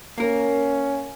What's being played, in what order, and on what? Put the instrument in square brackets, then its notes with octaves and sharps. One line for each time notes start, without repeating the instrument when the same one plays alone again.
[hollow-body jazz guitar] A#3 A#4 [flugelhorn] C#4